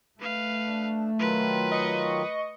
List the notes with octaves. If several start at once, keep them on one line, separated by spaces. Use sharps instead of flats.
A3 B4 F5
D4
D#3 F#3 F4 B4
D#5 C#6